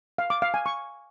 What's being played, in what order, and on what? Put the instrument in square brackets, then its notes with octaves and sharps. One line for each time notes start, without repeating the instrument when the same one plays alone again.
[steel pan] F5
D6
F5
G#5
C#6